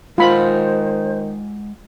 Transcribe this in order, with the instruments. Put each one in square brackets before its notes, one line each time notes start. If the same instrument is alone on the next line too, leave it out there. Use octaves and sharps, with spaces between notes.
[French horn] D#3 [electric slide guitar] G#3 F#5 G#5 [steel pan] F4 B5 [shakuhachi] C5